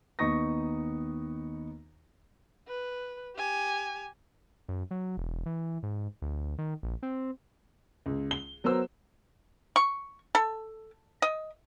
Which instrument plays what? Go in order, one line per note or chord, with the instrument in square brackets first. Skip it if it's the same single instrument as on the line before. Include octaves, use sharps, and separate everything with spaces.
[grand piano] D#2 B3 D#4 C#6 D#6 A#6
[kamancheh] B4
G4 G#5
[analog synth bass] F#2
F#3
E1
E3
G#2
D2
D#3
A#1
C4
[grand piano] C#2
G7
F#3 B3 A#4 C5 E6
[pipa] C#6
A4
D#5